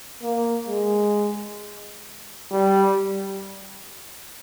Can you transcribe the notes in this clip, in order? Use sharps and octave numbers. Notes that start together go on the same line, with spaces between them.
A#3
G#3
G3